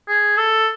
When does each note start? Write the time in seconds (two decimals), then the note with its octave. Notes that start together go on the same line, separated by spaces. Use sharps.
0.08 G#4
0.37 A4